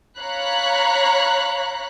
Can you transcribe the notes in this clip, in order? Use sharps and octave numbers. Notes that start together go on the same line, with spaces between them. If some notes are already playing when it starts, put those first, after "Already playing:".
C#5 F5 A#5 B5 F#6